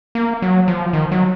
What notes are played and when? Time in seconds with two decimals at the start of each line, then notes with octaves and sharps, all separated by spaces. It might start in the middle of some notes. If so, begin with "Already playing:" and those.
0.15 A#3
0.42 F#3
0.68 F3
0.93 D#3
1.12 F#3